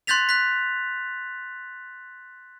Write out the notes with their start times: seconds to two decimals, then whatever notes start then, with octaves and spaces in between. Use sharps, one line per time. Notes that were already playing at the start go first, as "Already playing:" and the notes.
0.07 C6 F#6 G6 A6 B6 F7
0.29 F#6 B6